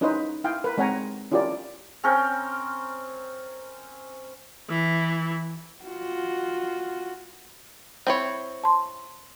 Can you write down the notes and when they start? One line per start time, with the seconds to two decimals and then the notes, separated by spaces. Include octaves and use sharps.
0.01 C#4 D#4 E4 B4 C5 D#5
0.44 E4 F5 G5 G#5
0.64 A#4 B4
0.77 G#3 C4 C#5 F#5 G#5 A#5
1.32 C#4 E4 F4 G4 A#4 D5
2.04 C4 C#4 A#4 G5
4.70 E3
5.84 F4 F#4
8.07 C4 E4 C#5
8.64 A5 C6